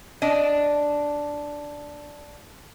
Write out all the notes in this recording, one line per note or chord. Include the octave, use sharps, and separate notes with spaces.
D4 D#5